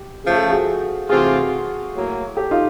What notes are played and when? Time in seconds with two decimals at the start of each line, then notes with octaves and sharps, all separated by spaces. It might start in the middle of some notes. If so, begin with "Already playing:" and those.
Already playing: G4
0.24 C#3 F3 A3 G#4
0.37 A4
0.50 F#4 G#4
1.09 C3 E3 A3 C4 F4 F#4 G#4
1.94 A2 F#3 A#3
2.37 G4 A4
2.51 D#4 F4